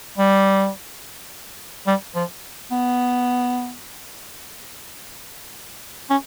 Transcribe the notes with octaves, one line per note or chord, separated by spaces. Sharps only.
G3
G3
F3
B3
C#4